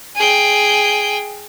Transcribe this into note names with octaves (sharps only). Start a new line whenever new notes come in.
G#4 G5